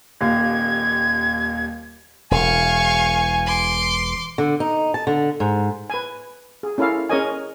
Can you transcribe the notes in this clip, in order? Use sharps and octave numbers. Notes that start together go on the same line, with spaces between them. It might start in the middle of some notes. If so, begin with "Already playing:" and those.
D#1 D#2 F5 G#6
E1 F5 G#5 C#6
C6 D6
D3
D#4
A5
D3
G#2
B4 G#5
G#4
C#4 E4 A4 A#4 F5
C#4 G#4 A#4 C#5 D#5 G#5